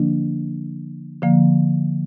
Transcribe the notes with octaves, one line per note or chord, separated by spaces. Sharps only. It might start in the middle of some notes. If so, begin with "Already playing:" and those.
Already playing: D3 F3 A#3 D4
D3 F3 A#3